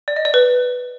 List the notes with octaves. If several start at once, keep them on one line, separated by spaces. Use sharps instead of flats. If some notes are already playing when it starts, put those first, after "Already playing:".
D5
D#5
D5
B4